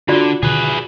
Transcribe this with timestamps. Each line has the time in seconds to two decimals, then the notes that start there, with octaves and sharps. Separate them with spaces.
0.08 D3 F4 F#4 D5
0.43 B2 D3 D#3 G#4 B4